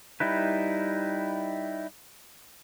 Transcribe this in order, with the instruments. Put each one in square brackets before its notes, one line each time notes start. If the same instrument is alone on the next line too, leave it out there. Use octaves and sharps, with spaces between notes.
[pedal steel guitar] G3 D#4 E4 B4